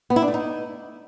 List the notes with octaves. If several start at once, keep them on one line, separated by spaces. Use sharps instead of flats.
B3
E4
D4
A3
D#4